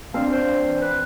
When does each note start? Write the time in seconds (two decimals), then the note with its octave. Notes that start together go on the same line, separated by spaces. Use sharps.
0.14 C4 D4 F5
0.32 C5
0.68 E3
0.82 B4